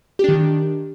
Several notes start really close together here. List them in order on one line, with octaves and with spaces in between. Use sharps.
G4 D4 D#3